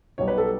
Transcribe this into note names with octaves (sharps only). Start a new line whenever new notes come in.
B1 B2 G3 C#5
B4
A4